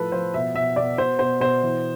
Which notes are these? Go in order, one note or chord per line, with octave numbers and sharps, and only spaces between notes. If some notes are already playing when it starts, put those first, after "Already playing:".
Already playing: A2 F3 A4 B4
F3 C5
B2 E5
B2 E5
B2 D5
B2 C5
B2 C5
B2 C5
E3